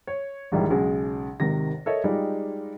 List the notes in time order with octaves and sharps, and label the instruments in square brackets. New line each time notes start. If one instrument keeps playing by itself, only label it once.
[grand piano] C#5
A#1 E2 G#2 D#3 G3 E4
B1 C#3 G#3
G#1 C3 D#3 A#6
A4 A#4 C#5 D#5 E5
G3 G#3 D#4 F4 G4